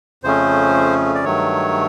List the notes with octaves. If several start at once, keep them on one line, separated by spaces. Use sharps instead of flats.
F2 C#3 F3 A3 C#4 C5
D5
G2 D#3 F#3 A3 C#5